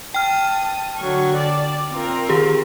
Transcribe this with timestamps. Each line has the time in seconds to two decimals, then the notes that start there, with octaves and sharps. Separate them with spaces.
0.14 G5 A5 D#6 F6
0.97 D3 F#3 C#6
1.36 D5 A5
1.91 C4 F4 A#4
2.29 D#3 G4 G#4